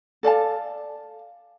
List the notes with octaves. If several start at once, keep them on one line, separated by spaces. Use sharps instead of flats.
A4 D5 F5 A5